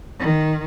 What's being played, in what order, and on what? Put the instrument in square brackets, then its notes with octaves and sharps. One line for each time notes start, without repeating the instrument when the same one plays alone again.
[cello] D#3